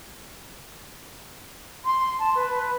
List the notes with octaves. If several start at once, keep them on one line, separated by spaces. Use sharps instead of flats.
C6
A5
B4